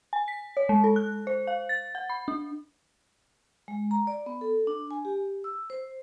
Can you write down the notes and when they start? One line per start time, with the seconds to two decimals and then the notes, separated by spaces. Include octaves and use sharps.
0.13 G#5
0.28 B6
0.57 C#5
0.69 G#3
0.84 A4
0.96 F#6
1.27 C5
1.47 F5
1.69 A6
1.95 F#5
2.10 B5
2.28 D4
3.68 G#3
3.91 A#5
4.07 D5
4.26 B3
4.41 A4
4.67 D4
4.91 G#5
5.05 G4
5.44 E6
5.70 C5